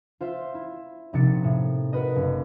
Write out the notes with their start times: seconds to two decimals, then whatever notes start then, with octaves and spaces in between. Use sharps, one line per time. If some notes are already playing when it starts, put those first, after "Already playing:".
0.21 F4 C5 E5
0.54 E4
1.13 A#1 C3 D#4 A6 C#7
1.44 A2
1.93 F#4 A#4 B4 D#5
2.16 F#1